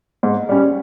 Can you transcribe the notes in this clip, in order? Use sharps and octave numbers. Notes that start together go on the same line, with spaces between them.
G#2
G3 C#4